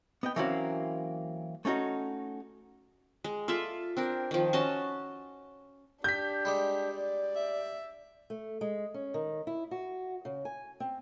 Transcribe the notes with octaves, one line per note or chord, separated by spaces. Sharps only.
B3 D#5 G5
E3 F#3 A#3 C4 C#4 F#4
A3 C#4 D#4 F#4
G#3
F4 A4 D5 E5
C4 D4 A#4
D#3 F3
C#4 F#4 D#5 A5
D4 G4 G6 B6
G3 G#3 D6
D5
E5
A3
G#3
C#4
D#3
E4
F#4
C#3
G#5
C4